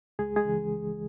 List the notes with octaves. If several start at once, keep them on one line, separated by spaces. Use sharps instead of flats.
C#2 G#3 G#4
G#3 G#4
C#3 E3